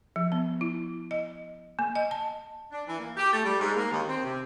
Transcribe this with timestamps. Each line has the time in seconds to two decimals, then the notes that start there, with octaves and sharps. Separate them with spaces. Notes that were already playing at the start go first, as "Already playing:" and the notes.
0.16 F3
0.32 B3
0.61 E4
1.11 D#5
1.79 A#3
1.95 D#5
2.11 A5
2.72 D4
2.86 E3
2.99 A#3
3.17 G4
3.32 A3
3.45 G3
3.59 G#2
3.76 A#3
3.91 D#2
4.07 C4
4.24 C3